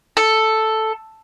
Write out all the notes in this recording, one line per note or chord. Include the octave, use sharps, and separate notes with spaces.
A4